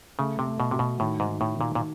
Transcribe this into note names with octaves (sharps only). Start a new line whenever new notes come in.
C#3 A3
C3
A3
B2
C3 F#4
B2
A2 D#3
G#2
D#3
A2
D#3
A#2
A#2